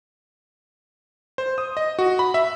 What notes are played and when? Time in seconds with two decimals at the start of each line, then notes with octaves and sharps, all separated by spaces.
1.38 C5
1.58 D#6
1.77 D#5
1.99 F#4
2.19 B5
2.34 E5